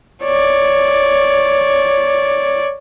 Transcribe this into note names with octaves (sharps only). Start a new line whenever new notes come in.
C#5 D5